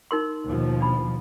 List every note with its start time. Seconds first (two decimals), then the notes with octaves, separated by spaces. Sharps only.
0.11 D#4 A#4 C6
0.46 D#2 B2 F3
0.81 D4 B5